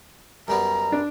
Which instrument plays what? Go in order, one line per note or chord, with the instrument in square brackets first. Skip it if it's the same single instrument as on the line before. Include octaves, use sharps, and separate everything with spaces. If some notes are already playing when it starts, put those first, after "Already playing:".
[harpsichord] F#2 G3 B3 [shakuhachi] A#5
[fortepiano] D4